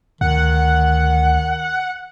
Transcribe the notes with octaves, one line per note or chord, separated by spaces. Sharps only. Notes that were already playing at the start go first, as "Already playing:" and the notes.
D2 D#3 F#5